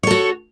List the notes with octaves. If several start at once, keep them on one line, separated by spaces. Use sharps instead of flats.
F#4 A4 C#5